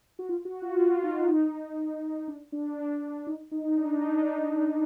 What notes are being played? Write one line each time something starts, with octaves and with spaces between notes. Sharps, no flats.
F#4
F4
F#4
F4
F4
D#4
D4
D4
D#4
D#4
D4
D4
D#4